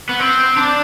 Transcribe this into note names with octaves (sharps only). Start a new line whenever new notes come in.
B3
C4
D4